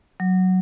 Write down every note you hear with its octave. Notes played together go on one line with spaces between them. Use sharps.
F#3